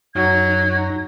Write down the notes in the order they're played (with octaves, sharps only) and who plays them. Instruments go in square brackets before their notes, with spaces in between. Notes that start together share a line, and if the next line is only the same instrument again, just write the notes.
[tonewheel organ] F#2 D#4 A#6 [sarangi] F#3 [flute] G#6